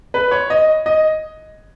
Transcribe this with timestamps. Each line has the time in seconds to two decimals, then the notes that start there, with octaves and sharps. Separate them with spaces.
0.14 B4
0.31 C#5
0.50 D#5
0.86 D#5